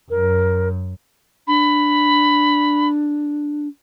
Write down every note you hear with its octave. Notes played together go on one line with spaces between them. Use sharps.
F#2 A#4
D4 B5